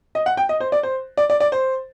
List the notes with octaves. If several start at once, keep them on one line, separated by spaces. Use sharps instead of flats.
D#5
F#5
G5
D#5
C5
D5
C5
D5
D5
D5
C5